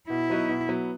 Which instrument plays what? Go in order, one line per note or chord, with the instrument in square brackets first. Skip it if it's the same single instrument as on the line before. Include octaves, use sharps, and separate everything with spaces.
[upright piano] B2 [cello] E4
[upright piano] F#3 B3 D#4 F#4
B2
F#3 B3